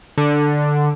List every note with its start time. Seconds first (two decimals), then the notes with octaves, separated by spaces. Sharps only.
0.18 D3